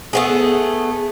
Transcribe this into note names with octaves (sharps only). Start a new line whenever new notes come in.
A3 B3 G#4